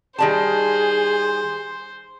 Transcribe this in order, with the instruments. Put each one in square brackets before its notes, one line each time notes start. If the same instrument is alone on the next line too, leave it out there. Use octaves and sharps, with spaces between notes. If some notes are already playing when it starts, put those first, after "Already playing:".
[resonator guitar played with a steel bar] D#3 G3 A5 [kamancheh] G#4 [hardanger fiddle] C5